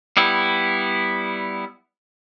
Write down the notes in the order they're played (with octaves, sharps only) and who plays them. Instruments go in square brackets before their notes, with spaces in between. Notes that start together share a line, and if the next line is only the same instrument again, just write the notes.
[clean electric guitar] G3 B3 E4